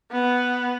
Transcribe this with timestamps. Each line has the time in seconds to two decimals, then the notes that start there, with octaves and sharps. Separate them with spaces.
0.11 B3